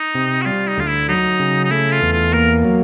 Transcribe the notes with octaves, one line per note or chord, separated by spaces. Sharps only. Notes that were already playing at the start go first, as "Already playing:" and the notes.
Already playing: D#4
C3
F#4
G3 F4
D#4
D2 F4
E4
F#3 D#4
C#3
D#4
A3 E4
F4
E2
F4
A#3 A#4
F#3